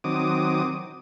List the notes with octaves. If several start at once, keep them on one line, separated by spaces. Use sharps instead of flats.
D#3 F#3 C4 D6 D#6